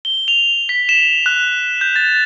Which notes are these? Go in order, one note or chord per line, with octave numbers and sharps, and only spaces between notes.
G7
F7
B6
E7
F#6
G6
A6